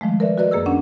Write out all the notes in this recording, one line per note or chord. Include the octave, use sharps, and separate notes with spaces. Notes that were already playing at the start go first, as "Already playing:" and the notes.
D#3 F3 G#3 A3
A#4 B4 D5 E5
F#4 A#4 B4 D5 D#5
F#2 A#3 G#4 A#4 E6
C#4 D4 F#5